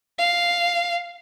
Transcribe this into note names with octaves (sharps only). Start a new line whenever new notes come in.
F5